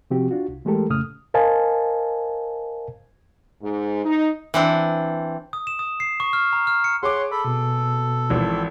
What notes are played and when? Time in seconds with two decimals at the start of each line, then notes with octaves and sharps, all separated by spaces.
0.10 C3 F3 C4 F#4 G4
0.31 D4 F4 F#4
0.48 C2
0.65 E3 G#3 A3 G4 A4 A#4
0.90 F2 A2 C#3 A3 D#6 F6
1.34 A#4 C5 D#5 F5 G#5 A5
3.62 G#2
4.05 D#4
4.54 E3 C4 D4
5.53 D#6
5.67 E7
5.79 D#6
6.00 C7
6.20 C#6
6.33 F6
6.53 A#5
6.67 F6
6.84 C#7
7.03 G#4 C#5 F#5 C6 D6
7.31 A4 B5
7.45 B2
8.30 G#1 E3 F3